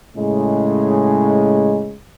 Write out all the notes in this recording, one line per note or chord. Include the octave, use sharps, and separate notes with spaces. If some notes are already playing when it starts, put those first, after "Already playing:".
A2 C#3 G#3